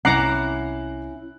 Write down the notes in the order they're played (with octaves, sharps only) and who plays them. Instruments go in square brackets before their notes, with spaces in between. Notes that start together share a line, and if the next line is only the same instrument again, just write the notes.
[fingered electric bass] C2 [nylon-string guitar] C#4 E4 [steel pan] F#5 A#5 D6 [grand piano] F#6 C7